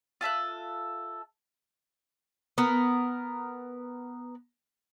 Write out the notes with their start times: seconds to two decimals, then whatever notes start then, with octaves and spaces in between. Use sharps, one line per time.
0.21 F4 A4 E5 F#6
2.58 B3 A#4